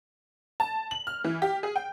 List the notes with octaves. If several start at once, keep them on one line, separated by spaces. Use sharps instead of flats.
A5
F#7
F6
E3
G4
G#4
G5